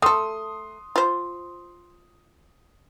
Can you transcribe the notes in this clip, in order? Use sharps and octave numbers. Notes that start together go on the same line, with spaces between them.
A3 A4 C6 D#6
F4 C5